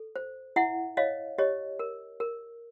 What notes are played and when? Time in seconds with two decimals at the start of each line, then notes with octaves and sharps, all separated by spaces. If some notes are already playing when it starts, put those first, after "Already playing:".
Already playing: A4
0.16 C5
0.56 E4 E5 F#5
0.97 C#5 D#5 F5
1.38 G4 C#5 D#5
1.79 A#4
2.20 A#4